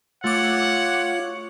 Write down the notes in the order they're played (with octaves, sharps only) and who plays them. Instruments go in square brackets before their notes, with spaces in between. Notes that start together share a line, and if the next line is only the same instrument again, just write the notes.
[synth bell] A3 D6 [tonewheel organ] F4 [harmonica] C#5 [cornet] F#5